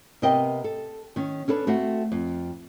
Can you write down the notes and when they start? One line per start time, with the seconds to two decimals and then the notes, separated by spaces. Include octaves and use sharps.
0.22 C3 B3 A#4 D#5 G5
0.64 A4
1.16 D#3 C#4
1.48 C#4 D4 A4 B4
1.67 A3 C4 F#4
2.12 F2